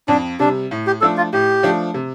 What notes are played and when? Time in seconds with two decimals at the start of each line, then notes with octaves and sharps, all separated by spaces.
0.08 F2 D4
0.39 C3 G3 D4
0.71 A2
0.87 G4
1.01 F3 A3 D4 A4
1.17 F4
1.33 A2 G4
1.63 F3 A3 D4
1.94 C3